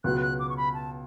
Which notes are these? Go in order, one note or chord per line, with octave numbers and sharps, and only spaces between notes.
C#2 B2 F#3 B3 F#4 F#6
F#6
D6
C#6
B5
A5